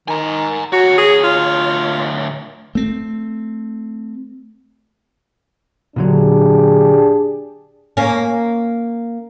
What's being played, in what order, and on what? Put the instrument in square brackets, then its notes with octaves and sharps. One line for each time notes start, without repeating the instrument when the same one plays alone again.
[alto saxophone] D#3 [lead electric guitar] G#5 A#5
[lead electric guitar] D2 C#5 [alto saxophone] F#4
[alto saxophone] G#4
F4
[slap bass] A3 C4
[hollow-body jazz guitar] A#2 D3 F#3 [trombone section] D4 G4 G#4
[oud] A#3 C#4